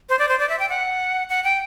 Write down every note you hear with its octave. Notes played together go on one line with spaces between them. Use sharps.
C5
D5
C5
D5
E5
G5
F#5
F#5
G5